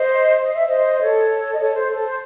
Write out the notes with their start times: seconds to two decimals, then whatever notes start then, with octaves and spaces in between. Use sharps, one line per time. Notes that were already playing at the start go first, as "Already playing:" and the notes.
Already playing: C5 D#5
0.42 D#5
0.55 E5
0.67 C5 D#5
1.01 A4 C#5
1.54 D#5
1.59 A4 C#5
1.74 C5
1.89 A4
2.03 C5